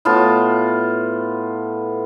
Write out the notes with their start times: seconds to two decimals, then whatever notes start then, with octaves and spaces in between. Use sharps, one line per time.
0.05 A2 B3 F4 A5